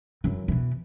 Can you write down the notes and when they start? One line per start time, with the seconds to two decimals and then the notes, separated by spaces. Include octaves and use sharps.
0.24 F#2 E3
0.48 B2 E3